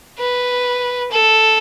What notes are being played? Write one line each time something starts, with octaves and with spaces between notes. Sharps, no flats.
B4
A4